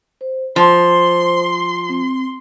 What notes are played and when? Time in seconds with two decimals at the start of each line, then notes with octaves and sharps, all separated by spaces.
0.21 C5
0.56 F3 C5 C6
1.89 C4